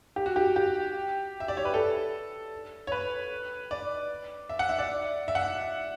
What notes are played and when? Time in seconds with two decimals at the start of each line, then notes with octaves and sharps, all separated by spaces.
0.16 G4
0.26 F#4
0.36 G4
0.56 G4
1.40 E5
1.48 D5
1.57 C#5
1.65 B4
1.74 A4
2.87 C#5
2.92 B4
3.71 D5
4.49 E5
4.59 F#5
4.69 E5
4.79 D5
5.28 E5
5.35 F#5
5.42 E5